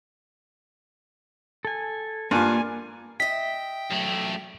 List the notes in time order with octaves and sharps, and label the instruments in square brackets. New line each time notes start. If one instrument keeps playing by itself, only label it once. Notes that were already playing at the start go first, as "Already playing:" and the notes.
[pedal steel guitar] A4 G#5
[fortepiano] G2 F4 [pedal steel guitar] A#3 [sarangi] G#5
[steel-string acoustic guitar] D#5 E5 [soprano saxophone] G5 [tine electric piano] B6
[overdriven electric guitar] F#2 A3